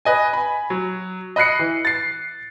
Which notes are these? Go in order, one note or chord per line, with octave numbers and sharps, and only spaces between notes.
B4 D#5 G#5
G#5 B5
F#3
D#5 B5 F#6 C7 C#7
E3
A6 C7